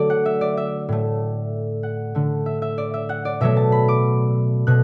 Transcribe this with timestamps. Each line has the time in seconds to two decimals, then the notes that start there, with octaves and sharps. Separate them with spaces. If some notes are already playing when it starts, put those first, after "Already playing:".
Already playing: D3 F#3 A3 D5
0.10 F#5
0.26 E5
0.41 D5
0.57 E5
0.89 A2 A3
1.83 F#5
2.15 D3 A3
2.46 E5
2.62 E5
2.78 D5
2.94 E5
3.09 F#5
3.25 D5
3.41 B2 F#3 A3 E5
3.57 A5
3.72 B5
3.88 D6
4.67 B2 A3 F#6